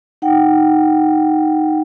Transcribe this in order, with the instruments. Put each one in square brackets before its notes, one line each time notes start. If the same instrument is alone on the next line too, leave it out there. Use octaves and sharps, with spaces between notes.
[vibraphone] D#4 F#5 G5